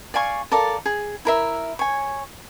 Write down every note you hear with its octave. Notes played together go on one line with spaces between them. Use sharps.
D5 F5 G#5 C#6
A4 A#4 D5 F5
G#4
E4 A#4 E5
C#5 G#5